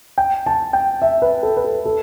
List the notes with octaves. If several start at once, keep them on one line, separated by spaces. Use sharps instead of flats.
G5
A5
G5
E5
B4
A4
B4
A4
A4